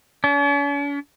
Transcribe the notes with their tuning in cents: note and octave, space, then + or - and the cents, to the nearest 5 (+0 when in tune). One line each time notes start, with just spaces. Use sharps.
C#4 +45